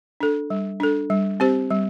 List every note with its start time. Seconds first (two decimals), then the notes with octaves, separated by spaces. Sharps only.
0.20 D4 A4
0.50 G3
0.80 D4 A4
1.10 G3
1.40 C4 G4 C5
1.70 G3